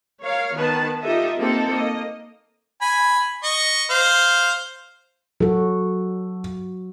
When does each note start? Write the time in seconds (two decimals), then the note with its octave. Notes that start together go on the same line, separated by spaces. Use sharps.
0.23 A#4 C#5 F5
0.54 D#3 B3 B4 A5
1.02 D#4 F4 G4 A4 D#5 E5
1.38 A#3 C4 D#4 A4
1.73 A#3 D#5
2.82 G#5 B5
3.44 D#5 C#6
3.90 C5 F5
5.41 F#3 F#4 A4